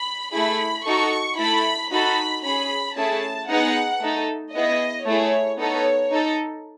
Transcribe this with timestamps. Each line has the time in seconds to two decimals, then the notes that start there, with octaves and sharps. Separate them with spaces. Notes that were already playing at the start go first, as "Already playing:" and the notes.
Already playing: B5
0.33 A3 E4 G#4 B5
0.86 D#4 F#4 A4 C#6
1.38 A3 E4 A4 B5
1.91 D#4 F#4 A4 B5
2.44 C#4 G#4 B5
2.96 A3 C#4 E4 G#4 A5
3.49 B3 D#4 G#4 F#5
4.01 A3 D#4 A4
4.54 B3 E4 G#4 D#5
5.06 A3 E4 G#4 C#5
5.59 B3 D#4 A4 C#5
6.12 D#4 A4